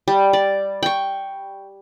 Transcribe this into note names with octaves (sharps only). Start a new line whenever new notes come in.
G3
D5
G5 C#6